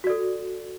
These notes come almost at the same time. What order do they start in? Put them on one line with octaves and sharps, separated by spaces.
F#4 D5 A4